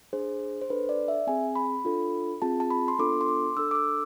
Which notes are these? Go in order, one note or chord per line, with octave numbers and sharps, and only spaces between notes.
D4 G#4 C5
C5
D4 A4 B4
D5
E5
C4 G#4 G#5
B5
D4 F4 A4
C4 F4 G#4 A5
A5
B5
C6
B3 D4 F4 A4 D6
C6
D6
D4 A4 E6
D6
E6